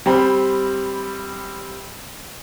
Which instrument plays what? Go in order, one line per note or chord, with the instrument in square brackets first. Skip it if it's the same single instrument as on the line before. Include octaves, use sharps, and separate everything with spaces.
[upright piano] G3 C4 B5